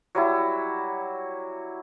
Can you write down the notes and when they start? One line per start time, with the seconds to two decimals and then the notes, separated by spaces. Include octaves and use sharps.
0.15 F#3 G3 E4